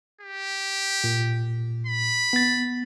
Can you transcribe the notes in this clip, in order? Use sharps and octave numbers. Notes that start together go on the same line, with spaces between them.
G4
A#2
B5
B3 A6